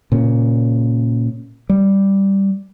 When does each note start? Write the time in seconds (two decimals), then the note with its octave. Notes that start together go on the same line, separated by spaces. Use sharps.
0.12 A#2 C#3
1.69 G3